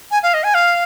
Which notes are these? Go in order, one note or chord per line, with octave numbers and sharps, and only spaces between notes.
G#5
F5
D#5
G#5
F5